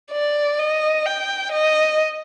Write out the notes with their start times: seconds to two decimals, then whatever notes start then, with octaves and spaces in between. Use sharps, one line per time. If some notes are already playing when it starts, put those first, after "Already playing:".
0.12 D5
0.59 D#5
1.06 G5
1.52 D#5